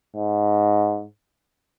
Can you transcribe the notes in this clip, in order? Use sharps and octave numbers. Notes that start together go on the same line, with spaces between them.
G#2